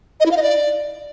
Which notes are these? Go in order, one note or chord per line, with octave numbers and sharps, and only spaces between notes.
D#5
E4
F5
D#5
D5